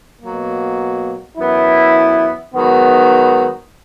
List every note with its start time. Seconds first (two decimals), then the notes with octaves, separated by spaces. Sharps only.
0.22 B2 F#3 A#3
1.38 F#2 E3 B3 E4
2.54 G#2 D#3 F#3 B3